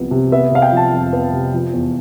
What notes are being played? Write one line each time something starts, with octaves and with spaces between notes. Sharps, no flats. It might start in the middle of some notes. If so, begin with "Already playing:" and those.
Already playing: C2 C3 F3 B3
C3
B3 E5
C3 F5
G5
F3 A5
F2
B3
C3
F3
E2